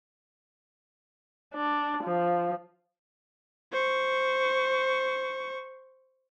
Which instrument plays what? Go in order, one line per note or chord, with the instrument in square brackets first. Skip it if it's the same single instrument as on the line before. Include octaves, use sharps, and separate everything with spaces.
[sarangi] D4
F3
[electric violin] C5 C#6